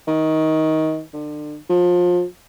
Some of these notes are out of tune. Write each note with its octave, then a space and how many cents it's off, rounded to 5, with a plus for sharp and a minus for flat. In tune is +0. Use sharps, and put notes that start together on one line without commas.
D#3 +20
D3 +30
F3 +25